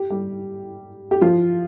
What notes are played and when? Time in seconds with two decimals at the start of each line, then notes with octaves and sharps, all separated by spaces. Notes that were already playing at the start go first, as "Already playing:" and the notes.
Already playing: G4
0.10 G3 G4
1.11 G4
1.21 F3 F4